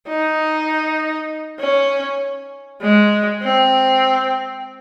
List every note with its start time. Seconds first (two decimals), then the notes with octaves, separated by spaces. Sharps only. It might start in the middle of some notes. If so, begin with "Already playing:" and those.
0.08 D#4
1.60 C#4
2.82 G#3
3.43 C4